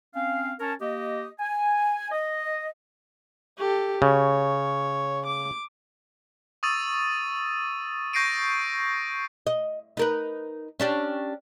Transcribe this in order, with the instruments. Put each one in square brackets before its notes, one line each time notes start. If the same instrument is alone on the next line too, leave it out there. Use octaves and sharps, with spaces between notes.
[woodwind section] C4 C#4 F5
C#4 A#4 C#5 A5
A#3 G4 D#5
G#5
D#5
[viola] G4 A4
[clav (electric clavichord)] C#3 [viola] C#5
[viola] D6
[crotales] C#6 D#6 E6 A6 D#7
C#6 G6 A#6 C7 D7 D#7
[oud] D#5
D#4 A#4 B4
C#4 D4 G4